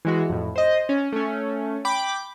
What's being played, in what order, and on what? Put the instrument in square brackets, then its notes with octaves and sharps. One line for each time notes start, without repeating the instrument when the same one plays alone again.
[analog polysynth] E3 G#3 F#4
F2 A2
C5 D#5
C#4
A3 C#4
G5 B5 D6